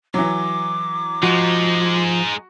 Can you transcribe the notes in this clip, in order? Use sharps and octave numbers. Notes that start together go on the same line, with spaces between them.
E3 F#3 D6
F3 G#3 D#4 F#4